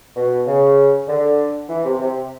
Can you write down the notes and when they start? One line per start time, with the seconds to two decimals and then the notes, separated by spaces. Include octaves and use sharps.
0.16 B2
0.46 C#3
1.08 D3
1.69 E3
1.85 C3
1.99 C3